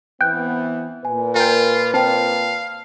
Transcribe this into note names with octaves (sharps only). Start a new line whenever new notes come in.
E3 B3 C4 G5 F#6
A#2 B4 G#5
F4 A#4 G5 G#5
C4 F5 G5 A5